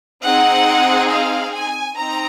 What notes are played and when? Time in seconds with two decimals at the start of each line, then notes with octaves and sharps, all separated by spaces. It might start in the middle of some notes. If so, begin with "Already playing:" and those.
0.24 C4 D#4 G#4 F#5
1.11 F5
1.54 G#5
1.97 C4 D#4 A#5